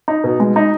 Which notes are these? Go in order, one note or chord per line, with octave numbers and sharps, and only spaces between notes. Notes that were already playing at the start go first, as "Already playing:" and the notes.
D#4
B2
G#3
D#4